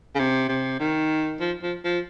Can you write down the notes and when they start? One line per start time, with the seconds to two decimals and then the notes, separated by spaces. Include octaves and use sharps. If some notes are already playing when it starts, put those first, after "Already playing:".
0.15 C#3
0.19 C3
0.49 C3
0.80 D#3
1.40 F3
1.62 F3
1.84 F3